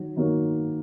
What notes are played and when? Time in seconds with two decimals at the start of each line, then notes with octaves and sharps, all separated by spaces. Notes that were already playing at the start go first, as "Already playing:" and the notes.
Already playing: D#3 F#3
0.16 D#3 A#3 F#4 C#5